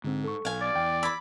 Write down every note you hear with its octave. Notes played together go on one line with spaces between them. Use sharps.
G#2 D3 C4
A4 C#6
B1 F5 G#5
D5
E2 G5
B5 D6 E6 G#6